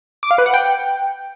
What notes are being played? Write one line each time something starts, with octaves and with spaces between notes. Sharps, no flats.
D6
F5
B4
F#5
G5